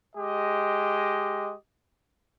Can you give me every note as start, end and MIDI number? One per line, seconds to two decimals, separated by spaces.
0.16 1.54 56
0.16 1.54 67
0.16 1.54 75